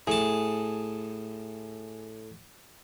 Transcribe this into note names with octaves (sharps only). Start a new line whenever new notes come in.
A2 G#4 A5